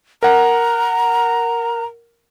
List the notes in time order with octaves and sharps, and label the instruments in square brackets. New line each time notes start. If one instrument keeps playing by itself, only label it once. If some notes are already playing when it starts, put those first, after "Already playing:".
[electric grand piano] A#4 F#5 [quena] A#5